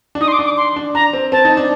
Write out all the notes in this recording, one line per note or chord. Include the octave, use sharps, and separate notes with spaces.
D4
D#4 D#6
C6
D6
D4
D6
C6
D4
D4 A#5
C4
C4 A5
D#4
D4